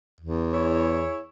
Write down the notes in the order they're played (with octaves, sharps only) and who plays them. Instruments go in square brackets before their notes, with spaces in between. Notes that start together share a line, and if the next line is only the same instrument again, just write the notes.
[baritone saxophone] E2
[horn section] E4 G#4 C#5